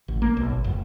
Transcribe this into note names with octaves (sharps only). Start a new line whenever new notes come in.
A1
A#3
B1
G#1
F1